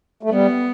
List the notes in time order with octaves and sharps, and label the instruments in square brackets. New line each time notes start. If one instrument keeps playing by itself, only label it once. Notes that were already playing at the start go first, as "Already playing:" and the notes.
[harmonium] A3
[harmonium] G3 [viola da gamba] B3